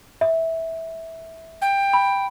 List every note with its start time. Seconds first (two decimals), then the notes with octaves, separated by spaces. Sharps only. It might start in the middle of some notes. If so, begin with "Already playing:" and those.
0.21 E5
1.62 G5
1.93 B5